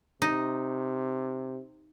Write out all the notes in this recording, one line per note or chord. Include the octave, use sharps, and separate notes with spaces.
C3 D#4